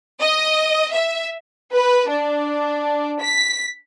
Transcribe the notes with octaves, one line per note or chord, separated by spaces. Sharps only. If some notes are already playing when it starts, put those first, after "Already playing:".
D#5
E5
B4
D4
B6